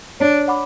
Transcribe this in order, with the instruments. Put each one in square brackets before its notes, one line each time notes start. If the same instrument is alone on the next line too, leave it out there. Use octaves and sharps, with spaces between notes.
[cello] D4 [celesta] C#5
[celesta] F#5 B5 D6